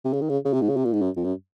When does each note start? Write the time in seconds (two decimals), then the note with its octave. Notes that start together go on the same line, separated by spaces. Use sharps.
0.05 C3
0.13 C#3
0.21 D#3
0.29 C#3
0.45 C#3
0.53 C3
0.61 G#2
0.69 C#3
0.76 C3
0.85 A#2
0.93 G#2
1.01 F#2
1.17 F2
1.24 F#2